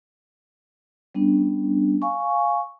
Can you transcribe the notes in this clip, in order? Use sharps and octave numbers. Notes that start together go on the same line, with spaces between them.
G3 B3 C#4 D4
F5 G#5 C#6